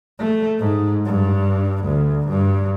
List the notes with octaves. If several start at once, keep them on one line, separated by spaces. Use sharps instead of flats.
A3
G#2
G2
D2
G2